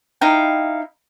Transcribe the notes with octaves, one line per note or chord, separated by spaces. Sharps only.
D#4 E4 F5 G5